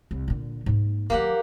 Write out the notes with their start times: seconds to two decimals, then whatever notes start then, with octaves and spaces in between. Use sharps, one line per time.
0.11 C2
0.28 A#2 D3
0.66 G#2 A#3
1.10 D#3 F#3 A#3 G4 F#5